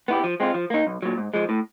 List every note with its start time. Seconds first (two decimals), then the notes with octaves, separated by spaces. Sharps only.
0.08 B3 E4 G4
0.24 F3
0.40 G#3 C4 F4
0.54 F3
0.70 A#3 D#4
0.87 B1
1.02 A#2 F#3
1.18 G#2
1.34 F3 G#3
1.49 A2